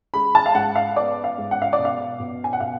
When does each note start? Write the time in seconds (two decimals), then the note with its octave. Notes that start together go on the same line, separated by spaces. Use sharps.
0.14 G#3 B5
0.35 A5
0.46 F5
0.55 G#2 F#5
0.76 F5
0.96 B3 D5
1.24 F5
1.38 G#2
1.51 F#5
1.62 F5
1.73 D5
1.78 B2
1.85 F5
2.19 B2
2.44 G#5
2.53 F#5
2.60 B2 F5